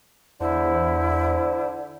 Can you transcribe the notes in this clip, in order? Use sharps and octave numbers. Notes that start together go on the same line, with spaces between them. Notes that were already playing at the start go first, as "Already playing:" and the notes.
E2 D3 E4 C5